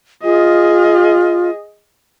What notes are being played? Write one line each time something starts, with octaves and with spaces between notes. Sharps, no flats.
F4 G#4 D#5